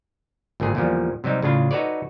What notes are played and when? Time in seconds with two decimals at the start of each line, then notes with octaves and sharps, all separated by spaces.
0.60 G#1 A#2 D3 G#4
0.75 E2 A#2 D3 F3 G3
1.24 C3 F#3 G3 D#4
1.43 A2 C#3 D4 F4
1.71 D#4 F#4 A4 B4 C#5 D5